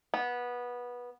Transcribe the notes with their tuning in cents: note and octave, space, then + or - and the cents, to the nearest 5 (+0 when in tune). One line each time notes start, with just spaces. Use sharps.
B3 -15